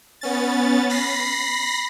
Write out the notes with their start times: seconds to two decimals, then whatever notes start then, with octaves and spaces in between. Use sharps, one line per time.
0.21 B3 C#4 A6
0.89 B5 A#6 C7